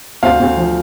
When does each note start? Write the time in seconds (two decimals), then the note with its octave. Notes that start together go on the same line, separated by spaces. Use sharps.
0.23 D2 C5 F5
0.40 D2
0.57 F3